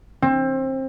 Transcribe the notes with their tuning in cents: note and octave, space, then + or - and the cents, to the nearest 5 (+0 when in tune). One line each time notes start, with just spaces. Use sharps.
C4 +25